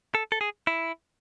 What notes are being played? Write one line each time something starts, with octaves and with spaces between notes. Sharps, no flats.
A4
A4
G#4
E4